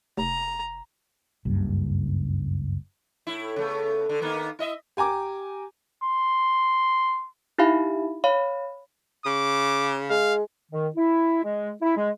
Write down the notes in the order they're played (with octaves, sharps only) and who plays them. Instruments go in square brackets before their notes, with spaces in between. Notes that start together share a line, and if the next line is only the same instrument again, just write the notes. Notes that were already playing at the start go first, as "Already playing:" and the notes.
[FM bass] F1 [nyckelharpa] A#5
[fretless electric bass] F#1 C#2 G2
[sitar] A2 E4
C#3 A3 B3
D3
D#3 A#3 B3
E4 D#5 E5
[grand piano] G4 G#5 A#5 D6
[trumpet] C6
[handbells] D#4 E4 G4 E5 F5 B5
C#5 F5 B5
[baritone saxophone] C#3 [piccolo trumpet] D6
[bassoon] G#3 [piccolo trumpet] F5
[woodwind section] D#3
E4
G#3
E4
G#3